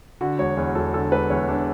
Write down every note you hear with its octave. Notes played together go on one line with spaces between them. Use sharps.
D3 F#4
E1 C#5
E2
E1 A4
D3 A4
E1 B4
E2 C#5
E1 D4